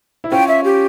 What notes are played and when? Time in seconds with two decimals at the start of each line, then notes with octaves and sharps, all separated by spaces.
0.24 E4
0.32 C#4 F4 G5
0.48 E5
0.64 G4